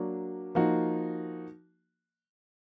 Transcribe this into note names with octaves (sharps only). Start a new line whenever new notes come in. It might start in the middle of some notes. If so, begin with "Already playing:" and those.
Already playing: F#3 A#3 D4 F#4
F3 A#3 D#4 F#4